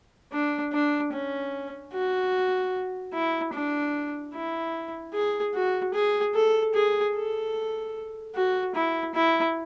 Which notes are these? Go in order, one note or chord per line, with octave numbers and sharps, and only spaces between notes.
D4
D4
C#4
F#4
E4
D4
E4
G#4
F#4
G#4
A4
G#4
A4
F#4
E4
E4